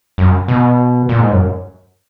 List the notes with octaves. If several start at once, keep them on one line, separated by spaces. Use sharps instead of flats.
F#2
B2
A#2
G#2
F#2